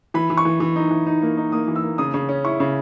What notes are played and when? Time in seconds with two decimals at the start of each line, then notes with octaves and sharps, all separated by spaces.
0.14 E3 B5
0.30 E3
0.37 C#6
0.45 E3
0.60 E3
0.76 D#4
0.91 E3
1.06 D#4
1.22 A#3
1.37 D#4
1.52 A#3 D#6
1.68 E3
1.76 E6
1.83 A#3
1.98 C#3 D#6
2.14 C#3
2.29 C#4
2.44 E4 C#6
2.60 C#3